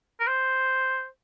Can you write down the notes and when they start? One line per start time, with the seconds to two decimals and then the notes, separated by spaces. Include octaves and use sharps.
0.20 A#4
0.27 C5